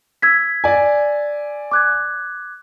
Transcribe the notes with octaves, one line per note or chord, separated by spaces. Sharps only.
E6 G#6 B6
D5 G#5
D6 F#6 G#6